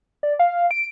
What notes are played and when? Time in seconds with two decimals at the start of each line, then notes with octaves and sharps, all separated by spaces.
0.23 D5
0.39 F5
0.71 D7